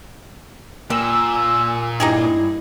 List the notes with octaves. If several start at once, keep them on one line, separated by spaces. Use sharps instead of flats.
A#2 G3 G#5 E6
G2 D#4 E4 G4 G#4